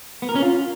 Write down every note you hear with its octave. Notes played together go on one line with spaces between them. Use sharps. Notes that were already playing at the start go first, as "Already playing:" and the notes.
B3
A#4
C#4
F4